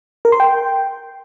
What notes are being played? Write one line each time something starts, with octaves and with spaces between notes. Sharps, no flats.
A#4
C6
G5